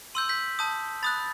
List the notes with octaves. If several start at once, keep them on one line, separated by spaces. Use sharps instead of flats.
C6 E6 G6 D#7 F#7
G6 B6
A5 D#6 G6
B5 D#6 F#6 A6